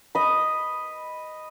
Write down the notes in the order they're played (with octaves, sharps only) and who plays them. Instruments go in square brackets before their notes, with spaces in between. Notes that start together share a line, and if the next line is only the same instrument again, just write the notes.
[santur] D#5 B5